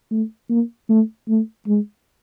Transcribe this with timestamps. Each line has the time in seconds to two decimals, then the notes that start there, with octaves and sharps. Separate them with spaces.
0.11 A3
0.49 A#3
0.89 A3
1.28 A3
1.67 G#3